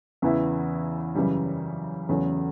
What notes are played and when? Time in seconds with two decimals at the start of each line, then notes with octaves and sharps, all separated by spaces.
0.22 E2 C#3 E3 B3 E4
1.15 F#2 C#3 E3 G3
2.09 E2 C#3 F#3 A3 C#4